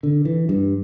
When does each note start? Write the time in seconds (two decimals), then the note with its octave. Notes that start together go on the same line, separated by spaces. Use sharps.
0.03 D3
0.25 E3
0.49 G2